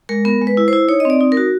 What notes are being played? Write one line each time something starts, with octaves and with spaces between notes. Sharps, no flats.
G#3 A#4
B3 A#4
G#3
B4
E4
C5
E4
D#4 C#5
D#5
C4 D5
D#4
A#4
F#4